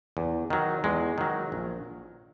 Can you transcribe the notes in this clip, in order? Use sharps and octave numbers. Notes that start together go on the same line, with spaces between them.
E2
D#3 F#3
E2 G#3
D#3 F#3
A#1